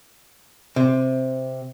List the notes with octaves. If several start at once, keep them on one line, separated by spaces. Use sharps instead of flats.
C3